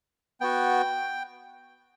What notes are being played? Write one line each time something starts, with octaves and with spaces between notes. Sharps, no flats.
B3 F#4 G5